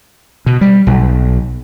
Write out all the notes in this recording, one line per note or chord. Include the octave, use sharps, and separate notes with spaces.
B2
G3
B1